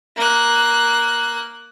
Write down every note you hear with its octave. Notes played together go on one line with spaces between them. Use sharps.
A#3 F#6